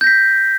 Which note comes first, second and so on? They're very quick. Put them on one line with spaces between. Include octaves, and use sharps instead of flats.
G6 A#6 B6